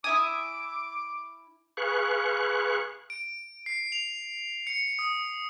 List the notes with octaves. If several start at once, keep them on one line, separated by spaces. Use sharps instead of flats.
E4 E5 G#5 D6 D#6
G#4 B4 F5 C#6 F#6
D7
C7
F7
C#7
D#6